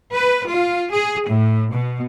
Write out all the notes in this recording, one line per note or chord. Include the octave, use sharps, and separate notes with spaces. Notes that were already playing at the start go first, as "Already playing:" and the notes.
B4
F4
G#4
A2
B2